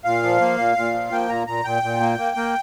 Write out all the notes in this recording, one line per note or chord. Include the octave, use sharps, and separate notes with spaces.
A#2 F5
F3
A#3
A#2
A#2
F3
A#3 G5
A#2 A#5
A#2 A#5
A#2 G5
A#2
A#3
A#3
A#3